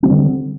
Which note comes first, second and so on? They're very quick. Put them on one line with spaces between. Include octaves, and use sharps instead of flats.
C4 F#3 G3 D3